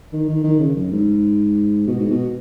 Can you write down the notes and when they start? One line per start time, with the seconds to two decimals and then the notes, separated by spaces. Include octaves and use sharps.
0.13 D#3
0.29 D#3
0.44 D#3
0.59 C#3
0.76 F#2
0.92 G#2
1.87 B2
1.99 G#2
2.10 B2